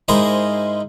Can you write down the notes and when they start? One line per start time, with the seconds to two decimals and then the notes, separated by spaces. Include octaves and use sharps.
0.08 G#2 G#3 E4 A#4 C5 D#6